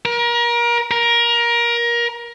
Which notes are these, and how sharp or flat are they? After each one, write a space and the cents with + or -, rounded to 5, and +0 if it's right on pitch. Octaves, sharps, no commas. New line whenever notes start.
A#4 +30
A#4 +20